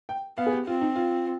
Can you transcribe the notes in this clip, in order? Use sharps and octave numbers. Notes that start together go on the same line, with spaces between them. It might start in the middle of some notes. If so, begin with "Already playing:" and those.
G5
B3 F5
G#4
G4
C4 F4
D#4
F4